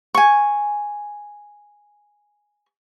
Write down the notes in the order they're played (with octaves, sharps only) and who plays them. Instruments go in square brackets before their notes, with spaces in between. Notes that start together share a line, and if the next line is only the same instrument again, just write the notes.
[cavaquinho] G#5 C#6